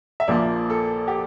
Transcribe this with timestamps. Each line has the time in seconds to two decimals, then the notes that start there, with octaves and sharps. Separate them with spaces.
0.20 E5
0.28 A#1 A#2 F3 A#3 D5
0.70 A4
1.08 G4